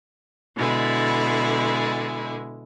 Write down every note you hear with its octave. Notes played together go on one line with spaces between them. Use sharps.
B2 D3 G#3 E4